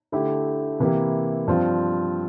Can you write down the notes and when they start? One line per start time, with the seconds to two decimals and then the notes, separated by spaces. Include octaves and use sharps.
0.12 D3 A3 E4 G4
0.80 C3 E3 A#3 E4 G4
1.47 G2 F3 C4 F4